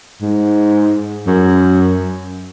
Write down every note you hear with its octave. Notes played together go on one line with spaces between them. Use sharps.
G#2
F#2